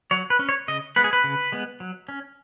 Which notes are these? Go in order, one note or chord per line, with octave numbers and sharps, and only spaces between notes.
F#3 C#5
B4
C#4
C#5
C#3 D#5
G#3 B3 B4
G#4
B4
C#3
G#3 B3
F#3
C#4